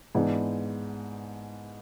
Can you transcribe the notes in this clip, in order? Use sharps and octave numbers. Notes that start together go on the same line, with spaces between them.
G#2 E3 B3 D4